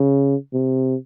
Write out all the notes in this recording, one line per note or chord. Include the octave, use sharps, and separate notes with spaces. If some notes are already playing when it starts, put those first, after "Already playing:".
Already playing: C#3
C3